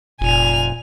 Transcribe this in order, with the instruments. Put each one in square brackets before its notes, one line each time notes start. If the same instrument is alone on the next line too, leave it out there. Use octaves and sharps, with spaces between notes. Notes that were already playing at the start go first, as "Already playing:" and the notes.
[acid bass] F1 [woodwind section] A#2 [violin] G#5 F7